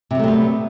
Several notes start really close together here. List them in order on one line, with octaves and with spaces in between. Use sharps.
C3 F#3 A3 G3 B3